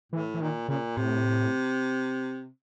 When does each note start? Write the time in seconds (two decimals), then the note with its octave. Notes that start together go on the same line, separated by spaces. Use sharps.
0.12 A2 E3
0.34 E3
0.41 A#2 D#3
0.68 A#2 C#3
0.97 A2 C3